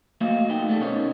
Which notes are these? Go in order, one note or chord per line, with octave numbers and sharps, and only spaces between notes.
A3 A#3 F#4 D#5 F5
A3 B3 D#4 G5
G3 A3 B3 A4
B2 C#4 D#4 A#4 C#5